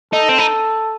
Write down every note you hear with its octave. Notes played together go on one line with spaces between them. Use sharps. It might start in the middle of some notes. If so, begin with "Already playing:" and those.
D#4 A4
C4
D#4